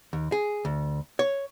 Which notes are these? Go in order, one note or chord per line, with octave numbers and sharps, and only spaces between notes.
D#2
G#4
D2
C#5